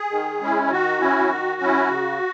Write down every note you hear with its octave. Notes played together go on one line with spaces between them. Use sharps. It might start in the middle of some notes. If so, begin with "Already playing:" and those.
Already playing: G#4
D#3
G#3 C#4 E4
D#3 F#4
F#3 C#4 E4
D#3
F#3 C#4 E4
C#3